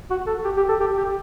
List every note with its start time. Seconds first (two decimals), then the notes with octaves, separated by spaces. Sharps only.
0.10 F#4
0.27 A4
0.45 G4
0.57 G4
0.69 A4
0.80 G4
0.98 G4